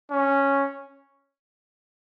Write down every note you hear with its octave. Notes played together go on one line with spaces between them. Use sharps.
C#4